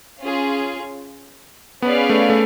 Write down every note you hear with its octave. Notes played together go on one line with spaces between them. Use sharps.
C#4 F4 G#4
B3 C#4 G#4 B4 D5 F5
A3
A3